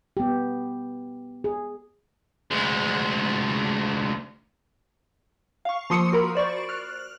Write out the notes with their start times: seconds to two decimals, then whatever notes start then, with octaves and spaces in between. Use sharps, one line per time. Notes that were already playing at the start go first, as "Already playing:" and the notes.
0.17 B3 G4
1.44 G#4
2.51 D2 G#3
5.65 F5 C#6
5.90 F3 A#3 C6 D#6 E6 C#7
6.12 F#4 A#4 A#5 B5
6.35 C5 D5 C#6 A6
6.69 F6 F#6